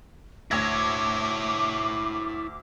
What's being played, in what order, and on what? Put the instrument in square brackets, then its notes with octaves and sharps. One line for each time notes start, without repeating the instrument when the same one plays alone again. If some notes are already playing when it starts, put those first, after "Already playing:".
[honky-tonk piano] D2 G#6 A#6 [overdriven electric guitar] E4 C#5 [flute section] D6